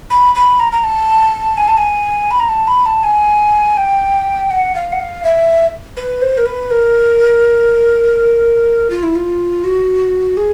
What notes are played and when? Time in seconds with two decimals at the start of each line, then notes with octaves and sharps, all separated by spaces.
0.10 B5
0.35 B5
0.59 A#5
0.72 A#5
0.84 A5
1.57 G#5
1.68 A5
1.77 G#5
2.31 B5
2.40 A#5
2.49 A5
2.67 B5
2.86 A5
3.03 G#5
3.77 G5
4.51 F#5
4.75 F5
4.92 F#5
4.99 F5
5.24 E5
5.97 B4
6.22 C5
6.37 A#4
6.46 B4
6.71 A#4
8.90 F4
9.03 E4
9.15 F4
9.64 F#4
10.37 G#4